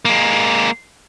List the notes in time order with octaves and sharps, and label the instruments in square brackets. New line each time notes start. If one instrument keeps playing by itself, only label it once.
[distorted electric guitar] G#3 A#3